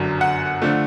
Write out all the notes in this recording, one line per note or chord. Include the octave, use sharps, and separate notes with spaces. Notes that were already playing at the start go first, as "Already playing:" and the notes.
Already playing: G1 F#2 D3 F#3
F#5
D3 F3 A3